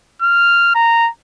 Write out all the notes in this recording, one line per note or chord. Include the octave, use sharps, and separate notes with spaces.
F6
A#5